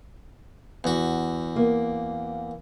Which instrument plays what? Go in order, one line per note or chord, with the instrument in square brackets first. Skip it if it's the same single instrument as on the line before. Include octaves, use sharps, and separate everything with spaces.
[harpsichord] E2 F#4
[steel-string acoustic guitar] A#3